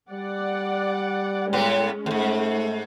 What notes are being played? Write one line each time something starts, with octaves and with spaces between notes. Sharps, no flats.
G3 D5 F#5
A2 G#3 B3 C#4
E2 G#2 A3